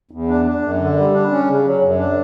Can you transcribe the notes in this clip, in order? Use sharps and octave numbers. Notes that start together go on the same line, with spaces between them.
E2
D4
D4
F#2
D3
G3
D4
C#4
C#3
F#3
F#2
D4